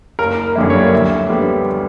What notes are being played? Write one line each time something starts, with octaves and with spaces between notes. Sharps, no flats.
F#1 A#4
F#2 D3 G3 A#3 E4
C#5
D5
D2 E5
D3 G3 B3